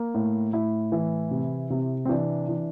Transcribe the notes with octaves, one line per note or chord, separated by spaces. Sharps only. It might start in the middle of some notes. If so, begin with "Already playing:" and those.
Already playing: A#3
A2
A2 E4
E3
C3
C3
C4
E3 D4
E3